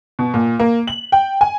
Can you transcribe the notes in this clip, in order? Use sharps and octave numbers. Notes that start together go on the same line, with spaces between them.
B2
A#2
A#3
F#7
G5
G#5